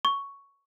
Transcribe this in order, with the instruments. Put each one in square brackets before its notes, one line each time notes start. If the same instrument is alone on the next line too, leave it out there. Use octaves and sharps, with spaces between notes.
[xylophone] C#6